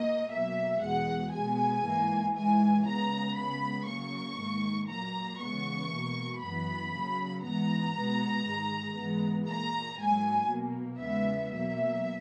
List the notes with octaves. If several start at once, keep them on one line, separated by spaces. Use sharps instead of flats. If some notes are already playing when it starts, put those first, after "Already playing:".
Already playing: A#2 A#3 D#5
B2 F#3 A#3 E5
E2 B2 G#3 F#5
B2 G#3 B3 G#5
G#2 E3 A#3
G#2 E3 G#3 G#5
C#3 G#3 B3 A#5
C#3 G#3 B3 B5
C#3 F#3 A#3 C#6
G#2 D#3 A#3
A#2 F#3 A#3 A#5
C#3 E3 G#3 B3 C#6
B2 A#3
F#2 E3 B3 B5
C#3 F#3 A#3
G#2 E3 B3 A#5
B2 G#3 B3
G#2 D#3 G#3
G#2 E3 G#3 B3
A#2 A#3 A#5
G#2 F#3 A#3 G#5
B2 A#3
E2 C#3 G#3 B3 E5
B2 F#3 A#3 E5